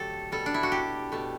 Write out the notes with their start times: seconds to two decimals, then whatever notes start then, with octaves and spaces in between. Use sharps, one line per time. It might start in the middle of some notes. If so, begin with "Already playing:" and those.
Already playing: D3 F#3 A3 G4 A4
0.32 B2 G3 A4
0.46 D4
0.54 E4
0.63 F#4
0.72 G4
1.12 B2 A3